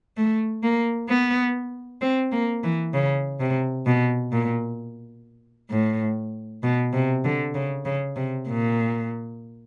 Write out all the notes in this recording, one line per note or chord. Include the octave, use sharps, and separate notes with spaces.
A3
A#3
B3
C4
A#3
E3
C#3
C3
B2
A#2
A2
B2
C3
D3
C#3
C#3
C3
A#2